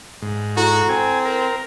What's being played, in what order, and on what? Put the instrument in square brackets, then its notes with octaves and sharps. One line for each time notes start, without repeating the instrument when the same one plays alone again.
[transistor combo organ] G#2
[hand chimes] E4 A4 A#5 [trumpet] F#4
[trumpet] C4 [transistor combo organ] G#5
[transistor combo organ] A#4